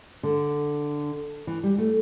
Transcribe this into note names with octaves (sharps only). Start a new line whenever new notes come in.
D3
E3
G3
A3